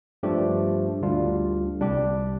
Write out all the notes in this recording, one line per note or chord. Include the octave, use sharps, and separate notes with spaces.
G2 F3 A3 D4 G4
D2 D3 G3 D4 F4
C2 C3 G3 D4 G4